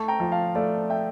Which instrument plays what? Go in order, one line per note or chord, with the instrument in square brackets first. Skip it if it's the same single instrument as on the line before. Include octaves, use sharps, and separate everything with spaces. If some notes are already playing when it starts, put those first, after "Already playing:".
Already playing: [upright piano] A3 [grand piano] A5 C#6
[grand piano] G5 A#5
[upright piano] F3
[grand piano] F5 A5
[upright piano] A3 [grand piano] D5 F5
[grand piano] E5 G5